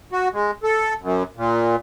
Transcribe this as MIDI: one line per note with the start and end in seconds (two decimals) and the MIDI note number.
0.12 0.28 66
0.33 0.51 56
0.63 0.93 69
1.01 1.23 42
1.37 1.76 46